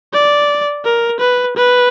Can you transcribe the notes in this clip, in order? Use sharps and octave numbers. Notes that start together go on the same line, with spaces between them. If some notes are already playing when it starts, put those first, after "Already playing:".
D5
A#4
B4
B4